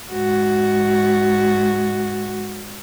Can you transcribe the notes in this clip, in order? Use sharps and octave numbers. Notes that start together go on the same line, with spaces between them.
G#2 F#4